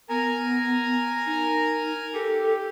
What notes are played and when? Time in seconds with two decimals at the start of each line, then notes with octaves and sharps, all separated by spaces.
0.09 B3 A#4 G#5 A#5
1.26 D#4
2.14 G4 A4